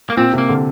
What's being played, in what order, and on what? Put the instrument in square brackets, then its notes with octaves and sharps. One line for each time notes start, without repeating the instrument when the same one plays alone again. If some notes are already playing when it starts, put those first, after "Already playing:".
[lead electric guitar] A#3
[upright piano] A#2 [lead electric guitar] C4
[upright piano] C3
[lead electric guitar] A#3
[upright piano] D3